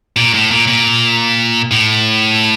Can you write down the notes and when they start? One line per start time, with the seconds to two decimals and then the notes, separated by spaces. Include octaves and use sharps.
0.17 A#2
0.34 A2
0.51 A#2
0.68 A#2
1.72 A2